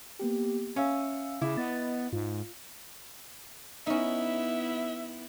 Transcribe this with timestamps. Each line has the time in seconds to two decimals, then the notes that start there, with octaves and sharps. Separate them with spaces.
0.19 A#3 B3 G4
0.76 C#4 E5 F5 E6
1.42 C#3 E4 E5 D6
1.57 B3 D#5 A6
2.13 G#2 F4
3.87 B3 C#4 D#4 E4 E5